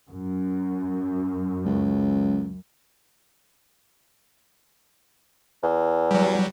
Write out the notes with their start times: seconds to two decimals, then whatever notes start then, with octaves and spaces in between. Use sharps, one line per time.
0.11 F#2
1.65 C#2
5.63 E2
6.11 F#3 G3